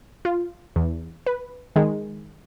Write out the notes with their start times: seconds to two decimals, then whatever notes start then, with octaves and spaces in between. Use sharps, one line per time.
0.25 F4
0.76 E2
1.26 B4
1.76 D#3 G#3